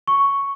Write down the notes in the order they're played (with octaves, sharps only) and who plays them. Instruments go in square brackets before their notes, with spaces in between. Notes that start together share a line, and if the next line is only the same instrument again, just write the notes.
[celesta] C#6